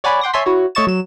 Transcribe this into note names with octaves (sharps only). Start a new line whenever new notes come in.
C#5 D5 F#5 G#5 B5
F#5 G5 C6 D6 A#6
C#5 E5 G#5 A5 C6 B6
E4 F#4 C#5
A3 C#5 D#5 C#6 A6 E7
F#3 E7